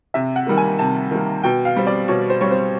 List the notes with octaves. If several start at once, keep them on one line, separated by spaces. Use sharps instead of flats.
C3 E5
F#5
D#3 G3 A#3
G#5
C3 A5
D#3 G3 A#3
B2 G5
F5
G3 C4
D5
B2 C#5
C5
G3 C4 C#5
C5